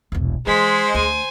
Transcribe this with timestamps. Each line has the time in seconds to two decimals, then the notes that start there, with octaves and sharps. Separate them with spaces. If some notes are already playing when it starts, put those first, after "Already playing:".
0.12 E1 C2
0.47 E3 G#3 C5 B6
0.95 D2 G#5